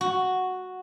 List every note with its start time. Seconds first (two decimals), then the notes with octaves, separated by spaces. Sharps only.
0.01 F#4